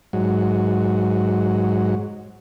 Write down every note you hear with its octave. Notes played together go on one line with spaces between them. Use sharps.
G#2 F#3